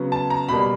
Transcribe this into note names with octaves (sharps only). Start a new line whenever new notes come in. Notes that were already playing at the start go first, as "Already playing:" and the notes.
Already playing: C#3 F#3 B3
A5
A#5
B2 G3 A#3 B5
B5